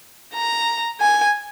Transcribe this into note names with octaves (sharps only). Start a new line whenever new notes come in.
A#5
G#5